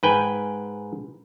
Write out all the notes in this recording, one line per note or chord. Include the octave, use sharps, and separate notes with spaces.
G#2 B4 G5 G#5